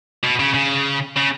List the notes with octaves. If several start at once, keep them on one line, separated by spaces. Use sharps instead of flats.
B2
C#3
C#3
C#3